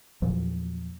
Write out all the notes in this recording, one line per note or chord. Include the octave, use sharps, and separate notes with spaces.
E2 A#2 F3 F#3